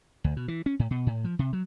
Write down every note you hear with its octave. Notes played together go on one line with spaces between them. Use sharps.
D2
B2
E3
C#4
A2
B2
A2
F3
C3
F#3